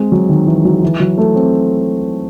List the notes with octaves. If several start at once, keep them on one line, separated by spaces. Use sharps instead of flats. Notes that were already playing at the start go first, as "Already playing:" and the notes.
Already playing: G#3 C4
F#3
D#3
E3
F#3
E3
F#3
A3
C4